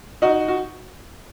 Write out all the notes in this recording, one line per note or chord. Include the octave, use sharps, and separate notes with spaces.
D#4 F#4
F#4